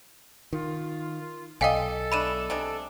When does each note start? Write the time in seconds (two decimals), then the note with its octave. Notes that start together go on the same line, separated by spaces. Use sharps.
0.53 D#3 F4
1.61 B1 A4 D5 D#5 F5 G5 G#5
2.12 G#3 A3 D4 B5 D#7 E7
2.50 C3 G#3 D4